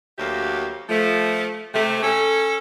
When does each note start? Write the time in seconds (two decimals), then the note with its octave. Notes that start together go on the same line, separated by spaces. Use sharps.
0.18 D2 F#3 A#3 G4 E5
0.89 F3 A3
1.75 C3 A3
2.03 C#4 A4